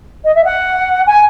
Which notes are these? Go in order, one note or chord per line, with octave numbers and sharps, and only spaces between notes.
D#5
E5
F#5
G#5